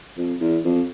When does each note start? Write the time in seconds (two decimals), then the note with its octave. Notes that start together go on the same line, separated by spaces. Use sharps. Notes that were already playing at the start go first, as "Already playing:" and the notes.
0.18 F2
0.40 E2
0.65 F2